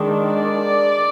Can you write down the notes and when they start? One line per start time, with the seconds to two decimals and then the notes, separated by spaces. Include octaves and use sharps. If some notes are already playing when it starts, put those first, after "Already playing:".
Already playing: D#3 G#3 D4
0.32 D5